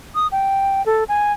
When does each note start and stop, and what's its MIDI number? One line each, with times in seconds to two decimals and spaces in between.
0.15 0.27 87
0.32 0.84 79
0.86 1.04 69
1.09 1.33 80